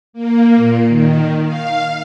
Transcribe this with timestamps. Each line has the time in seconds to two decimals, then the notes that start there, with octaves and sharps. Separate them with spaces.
0.13 A#3
0.55 A#2
0.88 D#3
1.45 F5